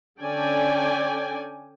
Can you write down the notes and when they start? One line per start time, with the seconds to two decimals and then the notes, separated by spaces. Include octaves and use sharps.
0.21 D3 C#4 A4 D5 G5 G#5